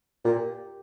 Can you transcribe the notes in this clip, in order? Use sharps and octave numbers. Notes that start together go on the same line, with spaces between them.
A#2 G4